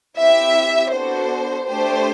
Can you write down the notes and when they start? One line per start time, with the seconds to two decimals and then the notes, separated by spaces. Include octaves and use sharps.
0.18 C4 E4 G4 E5
0.93 B3 D4 F#4 A4 C5
1.68 A3 D4 G4 C5